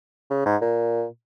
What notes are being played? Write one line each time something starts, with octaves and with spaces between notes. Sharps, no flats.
C#3
G#2
A#2